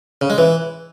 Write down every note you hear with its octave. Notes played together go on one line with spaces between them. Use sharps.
C#3
G#3
E3